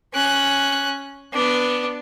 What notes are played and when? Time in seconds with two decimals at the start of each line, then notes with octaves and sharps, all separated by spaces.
0.14 C#4 F#6
1.33 B3 D4